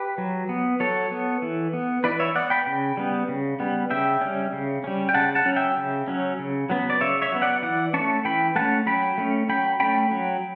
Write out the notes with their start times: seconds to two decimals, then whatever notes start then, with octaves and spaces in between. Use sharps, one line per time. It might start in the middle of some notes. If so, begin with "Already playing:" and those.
Already playing: G4 B4
0.18 F#3
0.49 B3
0.80 F#3 A4 C#5
1.11 B3
1.42 E3
1.73 B3
2.04 E3 B4 D5
2.19 C#5 E5
2.35 B3 D5 F#5
2.50 G5 B5
2.66 C#3
2.97 G3 B3
3.29 C#3
3.60 G3 B3
3.91 C#3 E5 G5
4.21 G3 C#4
4.53 C#3
4.84 G3 C#4
5.09 G5
5.14 C#3 F#5 A5
5.35 F#5 A5
5.46 F#3 C#4
5.56 E5 G5
5.77 C#3
6.08 F#3 C#4
6.39 C#3
6.70 F#3 B3
6.90 D5
7.01 C#3 C#5 E5
7.22 C#5 E5
7.32 F#3 B3
7.42 D5 F#5
7.63 E3 D5 F#5
7.94 A3 C#4 A5 C#6
8.25 E3 G5 B5
8.55 A3 C#4 F#5 A5
8.87 F#3 G5 B5
9.18 A3 C#4
9.49 F#3 G5 B5
9.80 A3 C#4 G5 B5
10.11 F#3